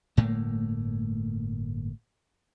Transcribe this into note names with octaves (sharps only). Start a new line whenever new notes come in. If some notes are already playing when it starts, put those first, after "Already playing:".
G1 A2 A3 A#3